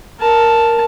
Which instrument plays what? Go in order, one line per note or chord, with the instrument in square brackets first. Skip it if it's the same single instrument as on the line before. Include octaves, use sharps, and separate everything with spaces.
[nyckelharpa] A#4 A5